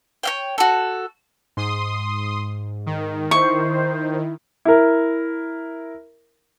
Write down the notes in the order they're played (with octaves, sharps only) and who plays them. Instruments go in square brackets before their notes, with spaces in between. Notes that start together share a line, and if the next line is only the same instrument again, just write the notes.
[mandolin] C#5 F5 G5
F#4 A4
[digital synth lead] G#2 [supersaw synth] C6 D#6
[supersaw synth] D#3
[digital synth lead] E4 [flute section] C5 [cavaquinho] C#6
[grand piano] E4 A#4